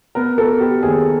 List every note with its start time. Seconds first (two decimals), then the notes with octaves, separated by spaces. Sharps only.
0.15 B3 A#4
0.38 B3 A4
0.60 B3 G4
0.83 D#2 G#4